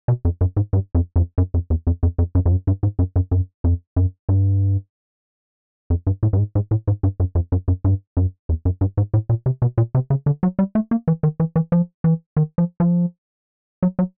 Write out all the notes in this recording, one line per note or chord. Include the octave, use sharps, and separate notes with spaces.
B2
F2
F#2
G#2
G2
F2
F2
F#2
F2
E2
F2
F2
F2
F#2
F2
F#2
G2
G#2
F#2
F#2
F#2
F2
F#2
G2
F2
G2
A2
G2
G#2
G#2
A2
G#2
G2
F#2
F2
F#2
F#2
G2
F#2
E2
F#2
G2
G#2
A2
A#2
C3
B2
A#2
C3
C#3
D3
F#3
G3
A3
A#3
E3
D#3
E3
E3
F3
E3
D#3
F3
F3
F#3
F#3